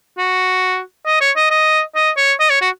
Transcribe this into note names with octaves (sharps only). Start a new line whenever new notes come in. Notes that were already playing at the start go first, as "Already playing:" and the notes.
F#4
D#5
C#5
D#5
D#5
D#5
C#5
D#5
C#5
F#4